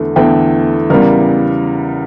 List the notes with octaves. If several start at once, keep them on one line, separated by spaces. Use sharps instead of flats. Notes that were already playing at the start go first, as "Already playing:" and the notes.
Already playing: E2 D3 A3
E2 D3 A3 G5
E2 C#3 G3 A#4